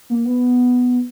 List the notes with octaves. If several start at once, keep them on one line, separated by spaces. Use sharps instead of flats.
A#3
B3